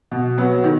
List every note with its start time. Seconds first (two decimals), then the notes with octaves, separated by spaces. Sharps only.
0.11 B2
0.38 F#3 B3
0.64 D#3